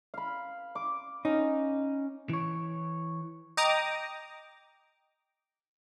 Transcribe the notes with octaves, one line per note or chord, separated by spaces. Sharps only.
F5 B5
D6
C#4 D#4
E3 C#5
D#5 G5 A#5 D6 D#6